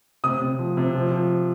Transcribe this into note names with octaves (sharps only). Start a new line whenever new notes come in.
C3 D#6
C3
F3
C3
F3
F3